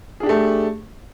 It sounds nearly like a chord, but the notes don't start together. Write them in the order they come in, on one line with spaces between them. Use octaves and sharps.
G#4 D4 G4 A3